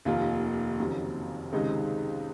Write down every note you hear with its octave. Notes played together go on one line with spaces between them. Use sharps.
F1 D#2 D#3 A#3 F4
F#1 F2 C3 D#3 F#3
C#2 C3 D#3 G#3 D#4